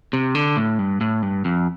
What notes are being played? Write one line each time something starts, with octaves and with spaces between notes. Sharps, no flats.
C3
D3
A2
G2
A2
G2
F2